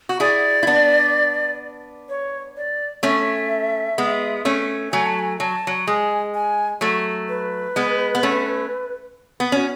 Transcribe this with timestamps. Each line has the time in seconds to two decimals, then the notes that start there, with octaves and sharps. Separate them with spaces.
0.09 F#4
0.20 E4 G#4 D5
0.63 E4
0.67 B3 D4
2.09 C#5
2.57 D5
3.03 A3 C#4 E5
3.98 G#3 B3
4.45 A3 C#4
4.92 F#3 A3 G#5
5.06 A5
5.19 G#5
5.40 F#3 A5
5.67 F#3
5.87 G#3 G#5
6.34 G#5
6.81 F#3 A3
7.29 B4
7.76 G#3 B3
8.15 B3
8.23 A3 C#4
9.40 B3
9.52 C#4 F#4